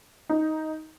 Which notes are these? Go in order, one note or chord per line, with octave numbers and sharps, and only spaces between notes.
D#4